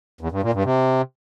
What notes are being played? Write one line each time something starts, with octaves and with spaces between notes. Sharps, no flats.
E2
G2
A#2
G2
C3